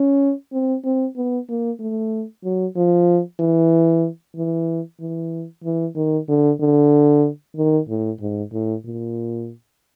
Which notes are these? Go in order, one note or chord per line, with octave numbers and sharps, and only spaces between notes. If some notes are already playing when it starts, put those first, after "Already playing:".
Already playing: C#4
C4
C4
B3
A#3
A3
F#3
F3
E3
E3
E3
E3
D#3
D3
D3
D#3
A2
G#2
A2
A#2